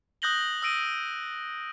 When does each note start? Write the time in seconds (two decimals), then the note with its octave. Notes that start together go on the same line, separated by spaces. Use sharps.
0.22 D#6 F#6 G6 A#6 F#7 G7
0.62 D#6 E6 A#6 D7 D#7